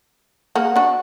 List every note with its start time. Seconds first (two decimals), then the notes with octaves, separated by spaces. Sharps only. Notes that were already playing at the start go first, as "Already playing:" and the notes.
0.56 A#3 G#4 F#5
0.76 D4 F#4